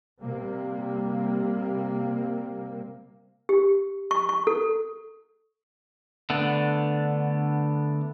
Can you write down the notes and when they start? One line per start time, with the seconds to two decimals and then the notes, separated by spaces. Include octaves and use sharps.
0.21 C3 G3 A#3
3.49 G4
4.11 C#6
4.29 C#6
4.47 A4
6.30 D3 A3 B3 D4